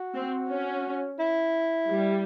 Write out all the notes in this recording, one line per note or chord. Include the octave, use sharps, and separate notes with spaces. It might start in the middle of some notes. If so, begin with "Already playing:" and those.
Already playing: F#4
C4
C#4
E4
G3